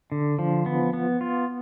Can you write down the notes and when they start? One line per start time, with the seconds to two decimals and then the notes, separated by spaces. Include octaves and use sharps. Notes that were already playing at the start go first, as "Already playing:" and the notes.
0.12 D3
0.39 F3
0.66 B3
0.94 B3
1.21 F4